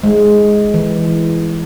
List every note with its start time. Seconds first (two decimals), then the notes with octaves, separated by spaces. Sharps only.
0.04 G#3
0.74 E3